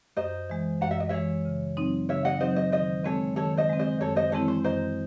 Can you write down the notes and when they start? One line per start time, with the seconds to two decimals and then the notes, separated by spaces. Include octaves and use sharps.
0.17 F#2 C5 D#5
0.50 E3 G#3
0.81 F#2 F#5
0.91 E5
1.00 D#5
1.09 E3 G#3 C#5 E5
1.45 C#3
1.77 F#3 C4 D#4
2.09 C#3 C#5 E5
2.25 D#5 F#5
2.40 F#3 C4 D#4 C5 D#5
2.56 C5 D#5
2.72 D#3 C5 D#5
3.05 G#3 C4 A4 C#5
3.36 D#3 A4 C#5
3.57 C5 D#5
3.69 G#3 C4
3.79 C5 D#5
4.01 F#2 A4 C#5
4.16 C5 D#5
4.32 E3 G#3 C4 E4 A4 C#5
4.48 C5
4.64 F#2 C5 D#5